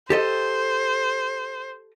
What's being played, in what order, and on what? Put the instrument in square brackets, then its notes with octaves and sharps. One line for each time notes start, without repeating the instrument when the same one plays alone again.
[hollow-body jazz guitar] G4 A4 D#5 [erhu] C5